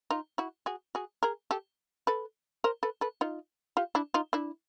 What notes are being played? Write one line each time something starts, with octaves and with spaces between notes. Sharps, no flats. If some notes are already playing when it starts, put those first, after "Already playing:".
D#4 F4
E4 F#4
F#4 G#4
F#4 G#4
G#4 A#4
G4 A4
A4 B4
A#4 C5
A4 B4
A4 B4
D#4 F4
F4 G4
D4 E4
D#4 F4
D4 E4